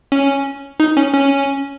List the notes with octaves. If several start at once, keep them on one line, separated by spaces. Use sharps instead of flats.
C#4
D#4
C#4
C#4